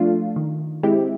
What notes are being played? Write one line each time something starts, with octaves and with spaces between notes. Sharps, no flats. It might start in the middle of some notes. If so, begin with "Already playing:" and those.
Already playing: F3 A3 D4 F4
D#3
G#3 C4 E4 G4